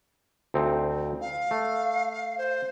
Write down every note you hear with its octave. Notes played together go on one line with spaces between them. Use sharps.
D2 C4 D#4
F5
A3
C5